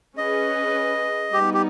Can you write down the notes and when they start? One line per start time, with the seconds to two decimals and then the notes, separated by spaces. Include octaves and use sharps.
0.17 C#4 G#4 B4 D#5
1.33 G3 B3 D#4 G4
1.54 G4